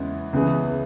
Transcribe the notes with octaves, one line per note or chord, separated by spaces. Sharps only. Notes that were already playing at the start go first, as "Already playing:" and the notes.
Already playing: E2 C#3 E3 G#3 B3
C#2 C#3 E3 B3 G#4